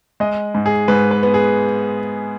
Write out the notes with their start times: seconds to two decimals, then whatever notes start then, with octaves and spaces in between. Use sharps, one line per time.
0.20 G#3 D#5
0.55 G#2
0.66 G#4
0.88 G#2 B4
1.11 B4
1.23 B3
1.34 G#4